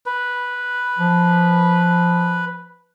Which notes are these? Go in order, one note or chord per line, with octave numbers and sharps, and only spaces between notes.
B4
F3